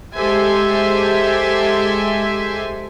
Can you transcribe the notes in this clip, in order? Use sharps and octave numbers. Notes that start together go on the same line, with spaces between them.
G#3 G4 A4 C5 E5 G#5